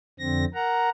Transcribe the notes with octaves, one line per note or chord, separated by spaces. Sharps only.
F2 D3 C4 A#6
A#4 F#5 A#5